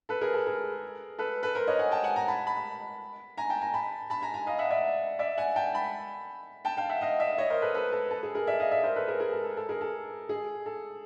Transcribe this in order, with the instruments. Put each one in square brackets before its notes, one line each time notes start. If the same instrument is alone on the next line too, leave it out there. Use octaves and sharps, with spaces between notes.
[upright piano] A4 B4
G#4 A#4
A4
G#4 A#4
A4 B4
A4 B4
A#4 C5
C#5 D#5
F#5 G#5
G5 A5
F#5 G#5
G#5 A#5
A5 B5
A5 B5
G#5 A#5
G5 A5
G#5 A#5
A5 B5
A5 B5
G#5 A#5
G#5 A#5
D#5 F5
E5 F#5
D5 E5
D5 E5
F#5 G#5
G5 A5
A5 B5
G5 A5
F5 G5
E5 F#5
D#5 F5
D5 E5
C#5 D#5
A#4 C5
A4 B4
A4 B4
A4
A4
G#4
G#4 A#4
D5 E5
D#5 F5
D5 E5
A#4 C5
A4 B4
G#4 A#4
G#4 A#4
A4
A4
A4
G#4 A#4
A4
G#4
A4